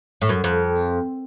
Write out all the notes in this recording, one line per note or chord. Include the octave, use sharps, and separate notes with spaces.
A2
F#2
F2